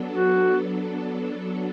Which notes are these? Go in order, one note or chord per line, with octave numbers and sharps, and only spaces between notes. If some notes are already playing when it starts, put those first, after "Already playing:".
Already playing: F#3 B3 D4 A4
F#4